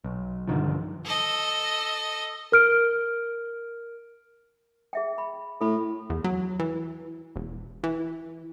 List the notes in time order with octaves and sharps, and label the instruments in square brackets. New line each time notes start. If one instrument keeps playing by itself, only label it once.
[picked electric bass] B1
G2 D3 D#3 F3
[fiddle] A4 D#5
[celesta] A#4 F6 D7
[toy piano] G#4 E5 G5
B5
[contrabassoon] A2 [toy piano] A4 B5
[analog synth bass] E2
F#3
E3
E1
E3